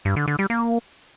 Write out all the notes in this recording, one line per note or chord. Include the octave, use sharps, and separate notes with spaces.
G2
D3
D3
G3
A#3